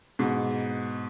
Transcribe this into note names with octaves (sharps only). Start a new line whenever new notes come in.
G#2 B2